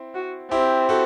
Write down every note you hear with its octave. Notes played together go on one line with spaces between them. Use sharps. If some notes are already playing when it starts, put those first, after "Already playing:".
Already playing: C4 E4
F#4
C4 E4 G4
F#4 A4